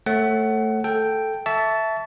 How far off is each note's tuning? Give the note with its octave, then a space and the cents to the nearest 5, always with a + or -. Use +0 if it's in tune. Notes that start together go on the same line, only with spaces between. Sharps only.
A3 +5 C#5 -30 F#5 +25
A4 +0 G5 +0
E5 +0 A5 -5 C#6 +25